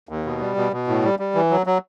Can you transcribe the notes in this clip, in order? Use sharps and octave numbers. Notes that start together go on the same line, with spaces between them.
D#2
B2
G3
B2
B2
A2
G3
G3
E3
F#3
F#3